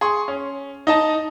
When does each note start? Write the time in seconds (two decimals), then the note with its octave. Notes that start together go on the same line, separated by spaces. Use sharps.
0.01 G#4 C6 C#6
0.28 C#4
0.87 D#4 D#5 A5